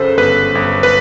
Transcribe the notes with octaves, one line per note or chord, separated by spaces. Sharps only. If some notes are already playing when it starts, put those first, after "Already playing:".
Already playing: F#2 C#3 A4 B4 C5
G1 B4
G1
B4